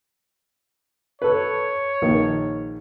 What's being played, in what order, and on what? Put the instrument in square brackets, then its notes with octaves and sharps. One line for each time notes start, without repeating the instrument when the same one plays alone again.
[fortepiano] A4 B4 [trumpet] C#5
[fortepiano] A#1 D#3